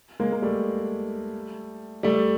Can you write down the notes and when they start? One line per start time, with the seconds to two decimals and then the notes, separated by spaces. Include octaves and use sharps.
0.20 G#3 A#3
0.32 A#3
0.42 G3 A3
2.03 G3 A3